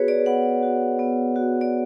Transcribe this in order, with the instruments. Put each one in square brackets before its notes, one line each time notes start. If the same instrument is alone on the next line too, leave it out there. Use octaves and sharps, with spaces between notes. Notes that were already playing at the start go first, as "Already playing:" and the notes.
Already playing: [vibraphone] B3 F#4 G#4 B4 C#5
D5
B3 F#5
F#4
B3
F#4
D5